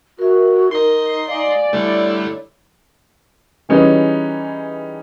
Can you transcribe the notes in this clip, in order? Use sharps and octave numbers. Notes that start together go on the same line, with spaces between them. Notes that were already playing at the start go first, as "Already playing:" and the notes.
F#4 A#4 E5
D#4 A#4 D#5 C6
D5 F5 G#5
D3 G3 A3 E4 C#5
E3 G3 C#4 D#4 G#4 B4